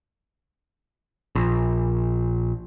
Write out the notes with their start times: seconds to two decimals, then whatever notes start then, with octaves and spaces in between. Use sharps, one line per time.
1.35 A#1